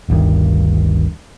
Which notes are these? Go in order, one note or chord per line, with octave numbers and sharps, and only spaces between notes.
G1 D2 G2 D#3